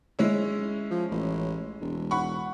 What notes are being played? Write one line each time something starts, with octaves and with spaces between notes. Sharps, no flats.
G#3 C#4 E4
F3
A1
E1
F#5 B5 C#6